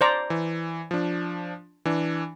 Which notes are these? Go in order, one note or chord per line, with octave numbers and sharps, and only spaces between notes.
C5 D5 A#5
E3
F3 D4
E3 D4